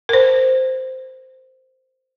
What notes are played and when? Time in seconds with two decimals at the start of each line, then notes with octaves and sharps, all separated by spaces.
0.09 A#4 C5